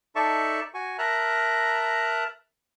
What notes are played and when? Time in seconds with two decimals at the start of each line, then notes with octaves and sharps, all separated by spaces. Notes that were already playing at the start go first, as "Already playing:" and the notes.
0.16 D#4 A4 D5 E5 A5 C#6
0.74 F#4 G#5 C#6
0.98 A#4 E5 A5 A#5 F#6